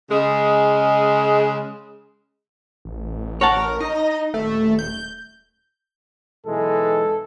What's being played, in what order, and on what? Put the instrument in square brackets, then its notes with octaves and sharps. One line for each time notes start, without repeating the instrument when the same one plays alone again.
[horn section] C#3 G#3
[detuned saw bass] A1
[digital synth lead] A#4 [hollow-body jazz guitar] C#5 F#5 A5
[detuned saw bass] D#4 [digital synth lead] D#5
[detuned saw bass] D#1 [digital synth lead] A3
[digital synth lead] G6
[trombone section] B1 E3 G#3 [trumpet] A4